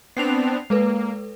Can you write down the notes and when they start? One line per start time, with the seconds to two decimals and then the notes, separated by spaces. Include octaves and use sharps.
0.17 B3 C4 D4 C7 F7
0.70 G#3 A#3 A4 B4